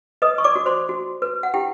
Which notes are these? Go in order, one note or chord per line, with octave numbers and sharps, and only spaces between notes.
B4 D#5 D#6
C#6
D5 D6
F#4
C5 C6
F#4
B4
F#5
E4 G4 G5